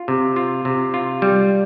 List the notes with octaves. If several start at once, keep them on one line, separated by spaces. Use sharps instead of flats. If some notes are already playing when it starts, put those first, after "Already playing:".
Already playing: F4
C3
F4
C3
F4
G3